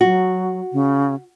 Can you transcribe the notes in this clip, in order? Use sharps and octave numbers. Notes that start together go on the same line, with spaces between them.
F#3 F#4
C#3